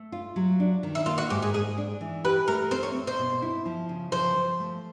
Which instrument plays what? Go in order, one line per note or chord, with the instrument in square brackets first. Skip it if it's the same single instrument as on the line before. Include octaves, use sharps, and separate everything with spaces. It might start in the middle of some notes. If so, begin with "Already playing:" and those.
Already playing: [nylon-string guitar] A3
F4
F#3
D4
D#3
[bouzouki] E4
[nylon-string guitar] A#3 [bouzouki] F4
[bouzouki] F#4
[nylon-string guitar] G#2 [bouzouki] G4
[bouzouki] G#4
[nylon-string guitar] G#2 [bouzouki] G#4
[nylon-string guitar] D4
E3
[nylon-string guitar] G4 [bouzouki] B4
[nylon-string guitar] A3 [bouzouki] A#4
[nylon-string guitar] C4 [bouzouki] C5
[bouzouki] C#5
[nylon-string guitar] C4
[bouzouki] C5
[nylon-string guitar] B2
E4
F3
C#3
[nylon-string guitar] F3 [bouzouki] C5
[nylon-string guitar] F3
A3